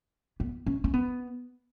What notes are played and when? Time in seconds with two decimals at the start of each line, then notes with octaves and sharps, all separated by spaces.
0.40 B3
0.66 C#4
0.84 C#4
0.94 B3